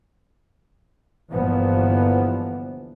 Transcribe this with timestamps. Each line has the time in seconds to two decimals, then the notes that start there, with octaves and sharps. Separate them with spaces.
1.32 G1 A#2 D3 E3 F3 B3